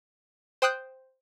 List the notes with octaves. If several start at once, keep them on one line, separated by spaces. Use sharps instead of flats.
C5 G5 D#6 F#6 G6